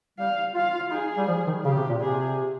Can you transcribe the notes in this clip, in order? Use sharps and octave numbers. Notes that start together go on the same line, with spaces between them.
G3 F5
F4 F5
F4
F4
D#4 G#4
G3
F3
D#3
C#3 G4
C3
A#2
C3 G#4